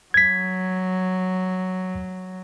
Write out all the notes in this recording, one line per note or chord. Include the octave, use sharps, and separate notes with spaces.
F#3 G#6 B6